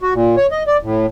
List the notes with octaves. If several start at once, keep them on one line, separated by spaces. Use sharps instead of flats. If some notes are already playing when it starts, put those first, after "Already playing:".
F#4
A#2
C#5
D#5
D5
A2